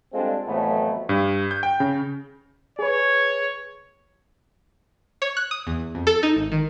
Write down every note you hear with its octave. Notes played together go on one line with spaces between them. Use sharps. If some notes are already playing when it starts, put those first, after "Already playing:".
G3 G#3 C4 D4 F4 A4
F2 A2 E3 F#3 A3 B3
G2
G6
G5
C#3
G#4 B4 C#5
C#5
F#6
D#6
E2
F2
A4
D#4
G#1
D#3